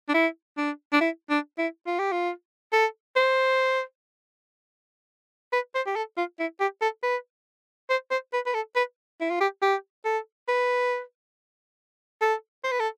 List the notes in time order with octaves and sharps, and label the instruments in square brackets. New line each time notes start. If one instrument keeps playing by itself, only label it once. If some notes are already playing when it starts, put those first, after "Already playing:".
[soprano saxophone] D4
E4
D4
D4
E4
D4
E4
F4
G4
F4
A4
C5
B4
C5
G4
A4
F4
E4
G4
A4
B4
C5
C5
B4
B4
A4
B4
E4
F4
G4
G4
A4
B4
A4
C5
B4
A4